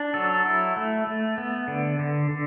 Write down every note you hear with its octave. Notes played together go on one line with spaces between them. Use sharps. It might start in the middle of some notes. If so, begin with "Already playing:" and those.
Already playing: D4
F#3 A4
E4
A3
A3
B3
D3
D3
D3